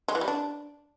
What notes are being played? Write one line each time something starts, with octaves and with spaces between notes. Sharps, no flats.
G#3
E3
G3
D4